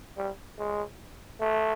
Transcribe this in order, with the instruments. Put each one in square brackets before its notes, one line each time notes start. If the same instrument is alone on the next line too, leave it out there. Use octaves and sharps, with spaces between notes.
[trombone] G3
G#3
A3